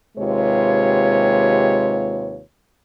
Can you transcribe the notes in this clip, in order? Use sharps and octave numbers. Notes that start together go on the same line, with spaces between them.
D#2 C3 G#3 F4 B4 C#5